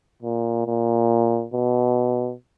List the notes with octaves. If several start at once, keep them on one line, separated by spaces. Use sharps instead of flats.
A#2
A#2
B2